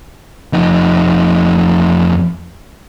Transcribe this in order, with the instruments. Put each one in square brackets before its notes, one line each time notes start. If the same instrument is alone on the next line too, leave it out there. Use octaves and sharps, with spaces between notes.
[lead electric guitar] F2 D#4